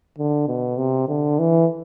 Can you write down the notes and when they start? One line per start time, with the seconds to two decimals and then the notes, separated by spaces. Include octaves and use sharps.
0.18 D3
0.48 B2
0.78 C3
1.08 D3
1.39 E3